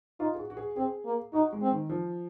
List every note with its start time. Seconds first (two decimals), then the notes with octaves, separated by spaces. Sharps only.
0.20 D#4 F4
0.35 G#4
0.39 F#4
0.50 F#4
0.57 G#4
0.77 C4 G#4
1.05 A#3
1.33 D#4 F#4
1.52 G#3
1.62 C4
1.71 D#3
1.90 F3